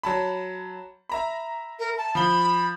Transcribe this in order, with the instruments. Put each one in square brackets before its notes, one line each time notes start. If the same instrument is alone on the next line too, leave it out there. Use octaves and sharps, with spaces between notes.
[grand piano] F#3 A5 B5
E5 A#5 B5
[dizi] A#4
A5
[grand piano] F3 G7 [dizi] B5